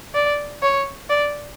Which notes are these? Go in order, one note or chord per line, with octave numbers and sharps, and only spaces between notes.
D5
C#5
D5